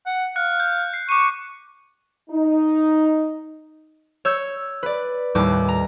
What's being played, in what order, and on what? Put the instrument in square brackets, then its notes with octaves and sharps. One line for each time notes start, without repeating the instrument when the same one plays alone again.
[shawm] F#5
[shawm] F5 [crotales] F#6 C#7
[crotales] G6
C7
[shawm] C#6 [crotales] D6 D#7
[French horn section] D#4
[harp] C#5 E6 G6
B4 D5
D#2 A2 G3 B4 D6
A#5